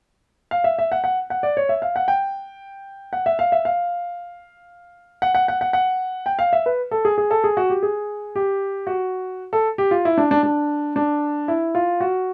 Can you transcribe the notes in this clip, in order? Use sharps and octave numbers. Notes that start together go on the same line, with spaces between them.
F5
E5
E5
F#5
F#5
F#5
D5
C#5
E5
F5
F#5
G5
F#5
E5
F5
E5
F5
F#5
F#5
F#5
F#5
F#5
G5
F5
E5
B4
A4
G#4
G#4
A4
G#4
F#4
G4
G#4
G4
F#4
A4
G4
F4
E4
D4
D4
D4
D4
E4
F4
F#4